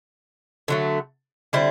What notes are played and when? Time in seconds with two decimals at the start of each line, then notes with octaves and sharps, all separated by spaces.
0.68 D3 F#3 A3
1.53 D3 G3 C4 E4